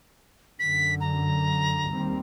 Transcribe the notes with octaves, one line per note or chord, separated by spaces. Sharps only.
F#2 D3 B6
A#5
D#2 G3 C4